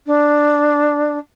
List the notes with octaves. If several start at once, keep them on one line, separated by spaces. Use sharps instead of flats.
D4